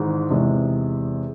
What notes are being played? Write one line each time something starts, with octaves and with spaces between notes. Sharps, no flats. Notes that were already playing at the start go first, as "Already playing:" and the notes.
Already playing: G#1 G#2 E3 G#3
E2 C3 E3 G#3